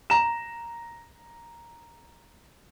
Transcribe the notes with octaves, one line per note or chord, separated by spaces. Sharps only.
A#5 E7